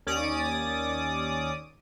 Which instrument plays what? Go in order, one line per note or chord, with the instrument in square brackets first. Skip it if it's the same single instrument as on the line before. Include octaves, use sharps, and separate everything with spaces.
[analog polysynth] D#2 C#4 D5 D6 D#6